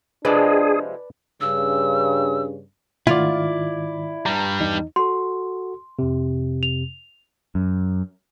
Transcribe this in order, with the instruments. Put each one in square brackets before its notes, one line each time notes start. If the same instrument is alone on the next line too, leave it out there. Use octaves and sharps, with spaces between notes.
[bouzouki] C3 F3 G#3 [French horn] D4 [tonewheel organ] G#4 [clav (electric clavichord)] B4 D5 A5
[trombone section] G2 C#3 [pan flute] E6
[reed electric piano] G#2 D#3 [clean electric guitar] E4 D5 [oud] F4
[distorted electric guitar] G2 G3 [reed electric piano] A#5
[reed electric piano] E2 D#4
[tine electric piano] F#4 A4 [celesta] C6
[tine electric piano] F2 C3
[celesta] F7
[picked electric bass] F#2